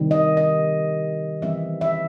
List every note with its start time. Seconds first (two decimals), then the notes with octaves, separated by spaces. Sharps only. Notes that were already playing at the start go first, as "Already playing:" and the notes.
Already playing: C3 D#3 G3
0.11 D#5
0.37 D#5
1.42 E3 G3 C4 E5
1.81 E5